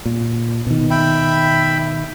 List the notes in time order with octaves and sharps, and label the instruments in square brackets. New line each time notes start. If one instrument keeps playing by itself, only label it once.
[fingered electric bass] A#2
B2 D#3
[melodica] E5 G5 B5